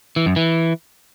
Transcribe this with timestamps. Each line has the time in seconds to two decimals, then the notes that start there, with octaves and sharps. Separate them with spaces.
0.16 E3
0.26 F#2
0.36 E3